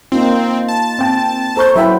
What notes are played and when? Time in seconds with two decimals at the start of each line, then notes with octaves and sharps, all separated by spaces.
0.12 A#3 C4 D#4 F4
0.68 A5
0.99 C4 G5 A6
1.57 A4 C5 A#5 C#6 G6
1.76 F#3 E4 B4 C5 E5 F#5 G5